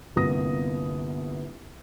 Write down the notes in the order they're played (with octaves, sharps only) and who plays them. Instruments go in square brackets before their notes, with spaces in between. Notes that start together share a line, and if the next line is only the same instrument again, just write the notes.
[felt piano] G1 C2 A#3 B3 D#6 A#6